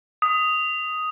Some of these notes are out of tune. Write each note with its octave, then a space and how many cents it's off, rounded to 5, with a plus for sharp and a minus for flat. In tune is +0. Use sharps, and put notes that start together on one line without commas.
D#6 +5